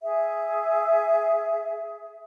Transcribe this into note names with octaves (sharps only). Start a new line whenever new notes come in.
G#4 E5